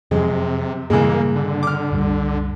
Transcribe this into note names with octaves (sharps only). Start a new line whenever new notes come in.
F2 C3 F3 F#3 G#3
G2 A#2 C#3 E3 G#3 A#3
D3
D6 F6
C2 F#2 G3